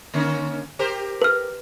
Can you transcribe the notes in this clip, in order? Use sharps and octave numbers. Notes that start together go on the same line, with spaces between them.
D3 A#3 C#4
G4 A#4 C5
B4 F6